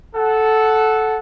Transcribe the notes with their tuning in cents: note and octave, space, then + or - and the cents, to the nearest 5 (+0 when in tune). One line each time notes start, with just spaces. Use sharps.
A4 -10 F#5 +0